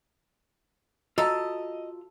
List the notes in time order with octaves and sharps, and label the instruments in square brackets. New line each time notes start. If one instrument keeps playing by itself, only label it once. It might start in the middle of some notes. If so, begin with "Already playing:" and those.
[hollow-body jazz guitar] F4 F5 A#5 [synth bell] F#4 E6 [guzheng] A4 [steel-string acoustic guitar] D#5